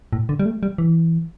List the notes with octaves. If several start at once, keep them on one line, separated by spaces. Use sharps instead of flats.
A2
D3
G3
A3
G3
E3